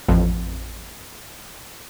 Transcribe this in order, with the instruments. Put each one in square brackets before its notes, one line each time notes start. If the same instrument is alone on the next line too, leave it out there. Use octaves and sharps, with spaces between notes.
[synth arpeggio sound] A1 F2